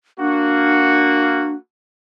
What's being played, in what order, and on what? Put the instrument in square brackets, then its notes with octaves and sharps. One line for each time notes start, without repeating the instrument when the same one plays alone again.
[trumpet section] A#3 F#4 [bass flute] D4